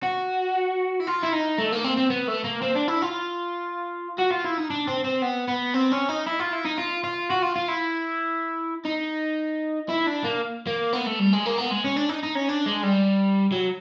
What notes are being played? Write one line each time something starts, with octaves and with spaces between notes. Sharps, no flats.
F#4
E4
F4
E4
D#4
A3
A#3
C4
C4
B3
A3
A#3
C4
D4
E4
F4
F#4
F4
E4
D#4
D4
C4
C4
B3
B3
C4
C#4
D#4
E4
F4
E4
D#4
F4
F4
F#4
F4
F4
E4
D#4
E4
D4
A#3
A#3
B3
A3
G3
G#3
A#3
B3
G#3
C#4
D4
D#4
D#4
C#4
D4
G#3
G3
F#3